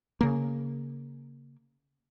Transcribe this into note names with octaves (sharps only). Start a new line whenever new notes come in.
C#3 A#3